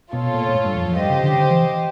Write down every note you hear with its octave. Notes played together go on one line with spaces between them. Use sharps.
B2 F4 A4 C#5
A#2
A#2
A2
G2
F2
F2
G2 G4 C5 D#5
C#3
D3
D3
E3